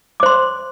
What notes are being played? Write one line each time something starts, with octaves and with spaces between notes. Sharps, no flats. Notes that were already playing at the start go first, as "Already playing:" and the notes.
C5 C6 D6